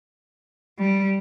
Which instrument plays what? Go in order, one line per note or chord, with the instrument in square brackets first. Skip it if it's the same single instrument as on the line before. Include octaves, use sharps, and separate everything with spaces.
[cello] G3